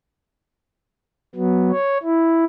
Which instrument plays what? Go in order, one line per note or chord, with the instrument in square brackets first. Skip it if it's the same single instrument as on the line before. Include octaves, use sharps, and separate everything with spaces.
[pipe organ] F#3 B3
C#5
E4